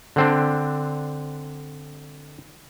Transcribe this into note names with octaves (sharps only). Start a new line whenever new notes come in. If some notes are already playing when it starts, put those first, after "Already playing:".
D3 C4 D4